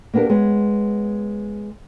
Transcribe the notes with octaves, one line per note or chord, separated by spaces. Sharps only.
A#3 B3 D4 G4 A#4
G#3 B3 C#5